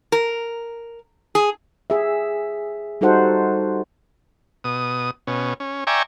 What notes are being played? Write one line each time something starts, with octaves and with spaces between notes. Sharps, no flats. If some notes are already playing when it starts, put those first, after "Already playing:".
A#4
G#4
G#4 E5
G3 D#4 F#4 A4 C5 F#5
B2 D#6
B2 C#4
C#4
D5 E5 G5 G#5 A#5 C#6